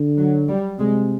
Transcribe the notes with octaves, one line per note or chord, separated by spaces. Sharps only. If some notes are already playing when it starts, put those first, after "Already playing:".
Already playing: D3
F#3
G3
C3 G#3